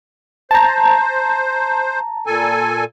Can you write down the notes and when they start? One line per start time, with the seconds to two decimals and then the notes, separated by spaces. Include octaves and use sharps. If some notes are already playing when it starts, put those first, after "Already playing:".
0.51 C5 A5 A#5
2.26 A#2 A4 G#5